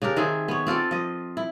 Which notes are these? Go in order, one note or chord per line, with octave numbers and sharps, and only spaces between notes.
C#3 D4 G4 A#4
D#3 C4 G#4 E5
B3 C#5
C4 F4 A4 D5
F3 D#5
E4